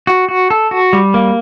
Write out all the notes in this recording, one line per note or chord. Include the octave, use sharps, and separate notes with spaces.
F#4
F#4
A4
F#4
G3
A#3